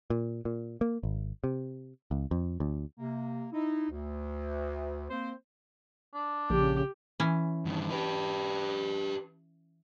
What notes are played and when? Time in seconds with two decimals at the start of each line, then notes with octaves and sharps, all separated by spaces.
0.10 A#2
0.45 A#2
0.81 A#3
1.03 G#1
1.44 C3
2.11 C#2
2.31 F2
2.60 D2
2.98 C3 A#3
3.53 D#4 E4
3.90 D2
5.10 A#3 C4 C5
6.13 D4
6.50 A#1 C#3 G4
7.20 E3 C#4
7.65 G2 D#3
7.90 G4 B4